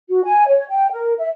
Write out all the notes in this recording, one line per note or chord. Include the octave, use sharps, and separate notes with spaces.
F#4
G#5
C#5
G5
A#4
E5